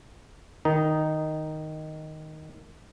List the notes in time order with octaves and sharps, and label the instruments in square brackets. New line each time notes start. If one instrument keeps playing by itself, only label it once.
[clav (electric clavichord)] D#3 D#4